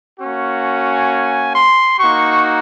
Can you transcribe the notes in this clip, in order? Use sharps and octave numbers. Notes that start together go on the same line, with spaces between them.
A#3 C#4 F#4
G#5
C6
A#3 D#4 F#4 C#6